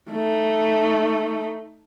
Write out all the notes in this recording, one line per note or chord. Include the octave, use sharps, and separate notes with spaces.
A3 D#4